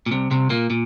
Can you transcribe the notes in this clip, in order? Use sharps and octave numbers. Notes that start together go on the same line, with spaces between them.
A#2
C2 C3
C2 C3
A#2 A#3
A#2